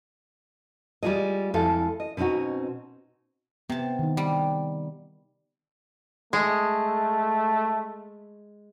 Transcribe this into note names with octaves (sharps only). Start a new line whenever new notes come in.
G3 G#3 F4 G#4 D#5
F2 F3 G#3 E4 A4 F5
D#5
B2 C4 C#4 D#4 F#4
C3 B3 A5
D#3 D#4
G3
G#3 A3